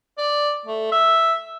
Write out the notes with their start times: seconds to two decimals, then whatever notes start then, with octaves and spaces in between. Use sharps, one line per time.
0.18 D5
0.66 A3
0.92 E5